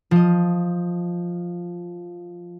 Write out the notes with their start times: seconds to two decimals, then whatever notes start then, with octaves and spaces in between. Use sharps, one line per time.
0.11 F3 D#5